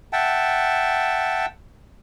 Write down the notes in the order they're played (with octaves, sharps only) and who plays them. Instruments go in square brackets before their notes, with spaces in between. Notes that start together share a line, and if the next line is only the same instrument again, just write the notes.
[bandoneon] E5 F#5 G5 A5